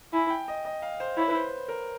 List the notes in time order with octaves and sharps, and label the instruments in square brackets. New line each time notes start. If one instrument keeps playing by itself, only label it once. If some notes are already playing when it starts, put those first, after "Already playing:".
[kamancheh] E4 [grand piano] G#5
[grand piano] G5
D#5
D#5
F5
C5
[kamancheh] E4 [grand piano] C#5
[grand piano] B4
C5
A#4